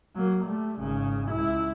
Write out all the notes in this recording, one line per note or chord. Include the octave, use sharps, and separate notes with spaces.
F#3 A#3
G3 A3
G#1 C#3
C#2 E4